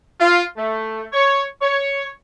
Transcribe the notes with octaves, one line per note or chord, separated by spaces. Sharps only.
F4
A3
C#5
C#5